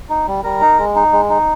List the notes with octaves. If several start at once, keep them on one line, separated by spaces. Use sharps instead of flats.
D#4
G3
G3 A#4
D#4
G#3
D#4
G#3
D#4